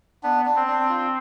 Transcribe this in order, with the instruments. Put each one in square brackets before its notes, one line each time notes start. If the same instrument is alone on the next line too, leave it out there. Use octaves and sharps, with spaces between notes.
[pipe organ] B3 [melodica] D4
[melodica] D4
[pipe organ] C4
[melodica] D4
F4